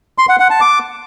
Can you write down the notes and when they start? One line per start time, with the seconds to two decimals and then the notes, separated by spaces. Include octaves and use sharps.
0.18 C6
0.29 F#5
0.40 F#5
0.50 A5
0.61 D6